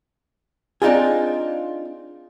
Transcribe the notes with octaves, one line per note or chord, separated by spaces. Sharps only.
C4 D4 D#4 F4 G#4